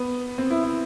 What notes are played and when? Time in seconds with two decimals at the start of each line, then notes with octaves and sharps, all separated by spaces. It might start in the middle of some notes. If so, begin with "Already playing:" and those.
Already playing: B3
0.38 C4
0.50 E4
0.63 E4